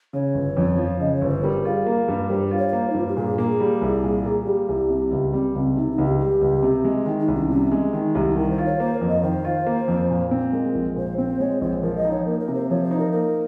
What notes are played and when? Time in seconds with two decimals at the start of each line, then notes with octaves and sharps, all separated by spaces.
0.13 C#3 C#5
0.35 G1
0.57 F2
0.78 F3
1.00 C#3 D#5
1.15 C#5
1.21 G1
1.29 C5
1.43 G3 A#4
1.65 F4 G#4
1.87 A#3 A#4
2.08 G2
2.29 G3 C5
2.51 F4
2.58 C#5
2.69 C#5
2.73 A#3 C5
2.90 D#4
2.94 G2 F4
3.08 G4
3.16 A#2 G#4
3.38 A#3 G#4
3.60 G3
3.82 C2
4.03 A#2
4.25 A#3
4.46 G3 G4
4.68 C2
4.90 C3
5.11 C#2
5.33 G3 C4
5.55 C#2 C4
5.76 C3 D#4
5.92 D#4
5.98 C#2
6.06 G4
6.19 G3 G4
6.41 C#2
6.63 C3
6.84 G#3
7.06 D#3
7.21 D#4
7.28 C2
7.35 C#4
7.50 C3 C#4
7.72 G#3
7.93 D#3 D#4
8.15 C2 G4
8.36 D#3 A#4
8.51 C5
8.58 F4
8.66 C#5
8.80 A#3 C5
8.94 A#4
9.01 F2
9.09 D#5
9.23 D#3 C5
9.45 F4
9.66 A#3
9.88 F2
10.10 A#2
10.31 C4
10.53 G#3 A#4
10.75 A#1
10.96 A#2 C5
11.18 C4 C5
11.40 G#3 C#5
11.61 A#1 C5
11.82 F3 A#4
11.97 D#5
12.05 D#4
12.11 C#5
12.26 A#3 A#4
12.40 A#4
12.48 C3
12.55 C5
12.70 F3 C#5
12.84 C5
12.91 D#4
12.99 A#4
13.13 A#3 A#4